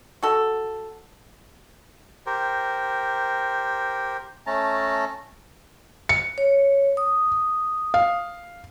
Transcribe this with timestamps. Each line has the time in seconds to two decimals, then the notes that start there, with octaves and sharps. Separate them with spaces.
0.23 F#4 A4
2.26 G4 A#4 C5
4.47 A3 C#4 A5 A#5
6.09 C#7
6.38 C#5
6.97 D#6
7.94 F5